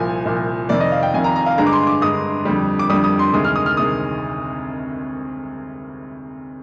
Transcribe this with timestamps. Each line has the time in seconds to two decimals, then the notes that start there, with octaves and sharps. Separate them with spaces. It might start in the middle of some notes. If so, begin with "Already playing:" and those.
Already playing: C2 A#2 F3 G#5
0.25 C2 A#2 F3
0.69 F2 C3 D#3 D5
0.80 D#5
0.92 F5
1.03 G5
1.14 F2 C3 D#3 G#5
1.24 A#5
1.36 A#5
1.46 F5
1.58 G2 D3 G#3 A#5
1.67 D6
1.73 C6
1.87 D6
2.01 G2 D3 G#3 D#6
2.45 F2 D3 G3
2.79 D6
2.90 F2 D3 G3 D#6
3.04 D#6
3.19 C6
3.33 D2 C3 D#3 G#3 D#6
3.45 F6
3.56 D#6
3.66 F6
3.77 C3 D#3 G#3 D#6